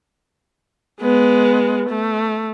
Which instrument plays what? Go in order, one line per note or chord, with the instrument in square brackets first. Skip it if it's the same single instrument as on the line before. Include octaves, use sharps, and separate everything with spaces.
[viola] G#3 B3
A3